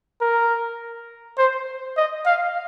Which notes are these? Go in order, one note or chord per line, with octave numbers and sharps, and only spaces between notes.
A#4
C5
D#5
F5